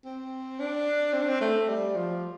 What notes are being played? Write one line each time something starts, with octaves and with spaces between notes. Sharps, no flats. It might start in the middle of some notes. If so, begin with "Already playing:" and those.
C4
D4
C4
D4
C4
A3
G3
F3